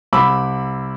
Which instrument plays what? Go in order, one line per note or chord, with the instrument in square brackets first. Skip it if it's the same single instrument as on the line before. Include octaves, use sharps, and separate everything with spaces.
[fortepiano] C2 B5 D6 E6